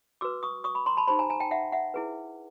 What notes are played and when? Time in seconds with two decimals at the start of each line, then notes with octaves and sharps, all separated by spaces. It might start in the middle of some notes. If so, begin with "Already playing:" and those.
0.21 F#4 B4 D6 E6
0.43 C#6 D#6
0.64 C#6 D#6
0.75 B5 C#6
0.86 A#5 C6
0.97 A5 B5
1.08 D#4 G4 C5 A5 B5
1.19 G#5 A#5
1.30 G#5 A#5
1.40 G5 A5
1.51 E5 F#5
1.72 E5 F#5
1.94 E4 G#4 B4